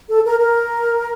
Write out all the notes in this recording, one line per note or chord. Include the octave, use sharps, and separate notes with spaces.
A4
A#4
A#4